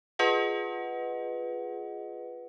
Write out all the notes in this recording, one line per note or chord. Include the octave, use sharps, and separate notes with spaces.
F4 G#4 B4 D#5 F#5